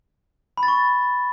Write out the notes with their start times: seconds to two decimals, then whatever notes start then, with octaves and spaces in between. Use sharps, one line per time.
0.57 B5
0.63 A6
0.68 C#6